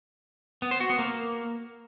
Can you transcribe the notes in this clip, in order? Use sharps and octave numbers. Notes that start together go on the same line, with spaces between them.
B3
C5
F#4
B3
A#3